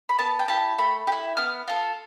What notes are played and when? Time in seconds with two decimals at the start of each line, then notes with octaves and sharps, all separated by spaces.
0.09 B5
0.19 B3 A5
0.39 G5
0.48 E4 G4 A5
0.78 A3 B5
1.07 G4
1.12 E4
1.37 B3 F6
1.68 F4 A4